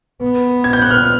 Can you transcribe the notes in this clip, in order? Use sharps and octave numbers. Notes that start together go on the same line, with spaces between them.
B3
G#6
G6
F#6
F6
F6